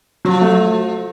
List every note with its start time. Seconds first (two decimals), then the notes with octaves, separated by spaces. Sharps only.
0.25 F3 F#3
0.42 A3